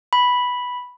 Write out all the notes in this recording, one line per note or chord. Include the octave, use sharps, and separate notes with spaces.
B5